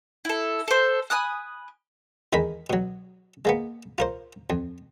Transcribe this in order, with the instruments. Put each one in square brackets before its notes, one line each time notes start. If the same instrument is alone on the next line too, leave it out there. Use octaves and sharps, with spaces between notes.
[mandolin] E4 A4
A4 C5
G#5 B5 D#6 F#6
[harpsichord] E2 D#3 G#3 A#4 B5
B2 F#3
G#3 A#3 B3
F4 A#4 C5
F2